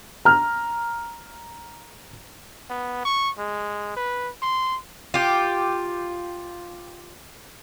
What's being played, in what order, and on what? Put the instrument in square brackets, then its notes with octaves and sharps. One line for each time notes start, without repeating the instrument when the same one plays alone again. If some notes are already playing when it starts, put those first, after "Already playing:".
[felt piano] A#5 F6
[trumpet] B3
C#6
G#3
B4
C6
[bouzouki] F4 G4